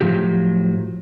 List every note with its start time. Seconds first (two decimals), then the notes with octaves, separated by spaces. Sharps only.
0.01 A2 F3 F#3 G4